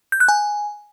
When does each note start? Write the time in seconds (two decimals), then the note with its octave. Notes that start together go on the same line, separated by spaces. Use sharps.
0.12 G6
0.20 F#6
0.29 G#5